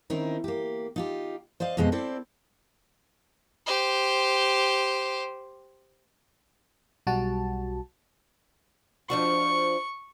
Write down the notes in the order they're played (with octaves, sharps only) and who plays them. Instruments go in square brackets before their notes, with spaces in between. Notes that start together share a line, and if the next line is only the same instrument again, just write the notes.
[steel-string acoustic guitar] D#3 C4 C#4 D#4 E4
A#3 G4
D#4 F4 G4
C5 D5 D#5 F5
F2 B2 G#3 C4 G4 D#5
C4 E4 A4 C5 D5
[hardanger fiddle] G4 C5
[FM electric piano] B1 G3 F#4 A5
[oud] F3 D4 F#4 [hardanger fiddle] C#6